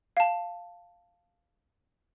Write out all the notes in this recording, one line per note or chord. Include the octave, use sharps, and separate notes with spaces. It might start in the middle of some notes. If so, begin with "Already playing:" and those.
F5 A5